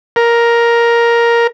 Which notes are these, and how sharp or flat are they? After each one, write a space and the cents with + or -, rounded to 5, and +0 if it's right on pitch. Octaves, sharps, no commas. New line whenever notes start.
A#4 +5